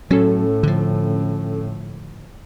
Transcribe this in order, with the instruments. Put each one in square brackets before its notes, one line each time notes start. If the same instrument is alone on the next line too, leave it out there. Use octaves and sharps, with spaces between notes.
[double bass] A2 [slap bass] F#3 [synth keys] C#4 A4
[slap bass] D3 F3